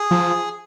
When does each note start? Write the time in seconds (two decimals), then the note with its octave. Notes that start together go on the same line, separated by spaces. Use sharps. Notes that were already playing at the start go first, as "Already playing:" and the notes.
Already playing: G#4
0.11 F3